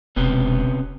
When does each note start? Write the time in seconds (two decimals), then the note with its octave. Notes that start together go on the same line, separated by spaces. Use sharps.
0.16 E1 C3 B3 C#4